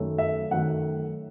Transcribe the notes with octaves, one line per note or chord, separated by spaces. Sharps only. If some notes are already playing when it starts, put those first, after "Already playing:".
Already playing: F#2 D#3 A3
E5
F#2 D#3 A3 F#5